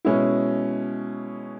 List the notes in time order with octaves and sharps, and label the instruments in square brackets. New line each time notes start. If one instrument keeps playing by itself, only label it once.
[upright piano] B2 G#3 C#4 E4